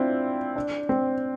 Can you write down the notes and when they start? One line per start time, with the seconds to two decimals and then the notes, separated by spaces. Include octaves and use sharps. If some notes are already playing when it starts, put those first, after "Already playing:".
Already playing: C4 D4 E4 F4
0.56 D4
0.89 C4